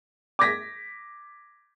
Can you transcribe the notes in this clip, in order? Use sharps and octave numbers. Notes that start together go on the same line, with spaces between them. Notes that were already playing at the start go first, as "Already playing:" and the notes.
D6 G#6 A#6 B6